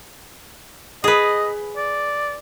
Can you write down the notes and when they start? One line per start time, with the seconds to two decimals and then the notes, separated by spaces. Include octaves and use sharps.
1.04 G#4 B4 D#5
1.77 D5